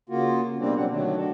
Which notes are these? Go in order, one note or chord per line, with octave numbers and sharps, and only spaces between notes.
C#3 A#3 F4 F#4
B2 G3 A#3 C4 D4
A#2 F#3 C4 D4 F#5
D3 D#3 F#3 A3 D4
D4 F#4 A4